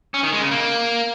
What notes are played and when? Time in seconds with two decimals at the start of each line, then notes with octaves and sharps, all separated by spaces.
0.14 C#4
0.23 D#3
0.33 G#3
0.42 C#3
0.51 A#3